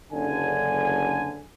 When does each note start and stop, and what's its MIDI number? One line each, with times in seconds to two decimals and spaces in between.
0.12 1.40 30
0.12 1.40 50
0.12 1.40 80